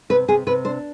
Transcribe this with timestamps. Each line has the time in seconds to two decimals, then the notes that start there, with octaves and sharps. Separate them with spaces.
0.10 C3 B4
0.28 C3 G#4
0.47 C3 B4
0.65 D4 C5